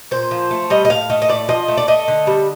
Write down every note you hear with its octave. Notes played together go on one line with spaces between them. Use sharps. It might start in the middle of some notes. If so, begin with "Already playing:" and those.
A#2 C5
F3
A3
G3 D#5
D#5
A2 F5
A3 D#5
D#5
A2 D5
F3 D#5
A3
D5
A3 D#5
D3
G3